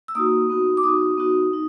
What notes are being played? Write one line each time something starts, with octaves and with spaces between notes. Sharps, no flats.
E6
A#3 D#4 F#4 D#6
B3 D#4 F#4
D6
B3 D#4 F#4 D#6
B3 D#4 F#4
B3 D#4